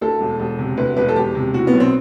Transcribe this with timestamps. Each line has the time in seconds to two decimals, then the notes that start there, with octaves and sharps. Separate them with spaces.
0.01 D2 A4
0.21 E1
0.40 E1
0.59 C3
0.77 D2 B4
0.97 E1 B4
1.09 A4
1.16 E1 G4
1.35 C3
1.54 A2 F#4
1.67 B3
1.73 B1
1.80 C4